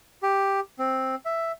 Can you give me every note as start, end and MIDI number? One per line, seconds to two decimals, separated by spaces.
0.23 0.60 67
0.79 1.15 60
1.26 1.52 76